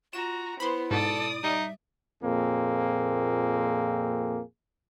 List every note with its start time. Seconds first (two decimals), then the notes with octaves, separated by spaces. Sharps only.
0.13 F4 F#4 A#5 E7
0.60 B3 E4 C5 B5 C6
0.91 G#2 B2 A4 D5 D#6
1.44 G3 D#4 E5
2.24 F2 A#2 A#3 C4 G#4